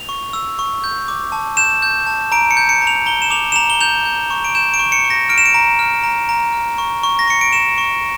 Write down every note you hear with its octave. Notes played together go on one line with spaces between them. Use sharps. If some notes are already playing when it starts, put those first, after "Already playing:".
Already playing: F7
C#6
E6
C#6
G6
D6
A5
G6 E7
G6
A5
A#5 D7
C#7
G6
C#7
A#5
F7
A#5 G7
E7
D6 F7
E7
A#5 F7
G7
G6 F7
G6
C#6
D7
G6 E7
D7
C#6
C#7
C#6
A#6
F6 D7
E7
D7
A#5
F6
A#5
A#5
F6
C#6
C#6
A#6
C#6 C#7
D7
C#6 E7
C#6